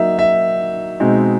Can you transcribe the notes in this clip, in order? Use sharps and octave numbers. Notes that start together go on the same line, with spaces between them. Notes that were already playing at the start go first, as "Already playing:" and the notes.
Already playing: F#3 A#3 D#4 E5
E5
B2 G#3 C4 D#4